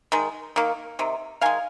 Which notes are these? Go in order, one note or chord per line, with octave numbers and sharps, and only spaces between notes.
D#3 G#3
D#3 A#3
C3 D#3
D#3 G#3 F5 G#5